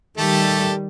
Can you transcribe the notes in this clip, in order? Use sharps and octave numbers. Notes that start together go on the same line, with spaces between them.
D#3 G3 A3 G4 A4